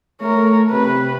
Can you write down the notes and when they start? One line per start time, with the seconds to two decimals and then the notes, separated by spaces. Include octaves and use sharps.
0.21 A3 A#4 C#5
0.70 C3 B4